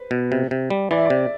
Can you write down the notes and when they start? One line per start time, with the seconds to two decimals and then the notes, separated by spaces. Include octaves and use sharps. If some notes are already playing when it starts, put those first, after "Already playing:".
Already playing: B4 C5
0.11 B2
0.32 C3
0.51 C3
0.70 G3
0.91 E3 D5
0.97 E5
1.06 C3 D5